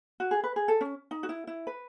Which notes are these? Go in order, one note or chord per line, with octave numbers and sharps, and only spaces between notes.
F#4
G#4
B4
G#4
A4
C#4
D#4
F#4
E4
E4
B4